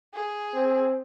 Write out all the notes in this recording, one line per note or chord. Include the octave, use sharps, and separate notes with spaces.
G#4
C4